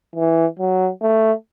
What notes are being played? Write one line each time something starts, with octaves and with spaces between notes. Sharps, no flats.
E3
F#3
A3